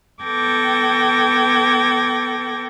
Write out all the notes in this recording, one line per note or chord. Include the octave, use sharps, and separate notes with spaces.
B3 A4 G5 D6 G#6 A#6